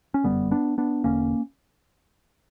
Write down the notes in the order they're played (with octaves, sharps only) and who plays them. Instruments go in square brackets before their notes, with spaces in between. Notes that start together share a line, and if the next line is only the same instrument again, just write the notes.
[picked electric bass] C#4
G1 F#2 D3 G3 B3
B3 D4
B3 D4
E1 E2 D3 A#3 C#4